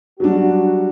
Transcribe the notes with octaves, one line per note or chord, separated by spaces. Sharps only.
F#3 G3 D4 F#4